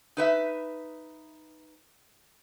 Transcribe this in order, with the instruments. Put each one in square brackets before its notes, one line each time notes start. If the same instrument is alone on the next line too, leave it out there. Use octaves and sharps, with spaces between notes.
[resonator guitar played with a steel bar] D#4 B4 E5